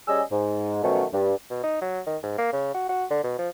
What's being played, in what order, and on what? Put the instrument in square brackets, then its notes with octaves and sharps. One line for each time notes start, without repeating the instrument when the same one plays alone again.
[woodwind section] G3 C#4 G#4 D#5 G#5 E6
G#2
B2 D#3 F3 F#3 A3 C#4
G2
[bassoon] B2
D#4
F#3
D#3
G#2
A#3
C#3
F#4
F#4
D3
B2
F3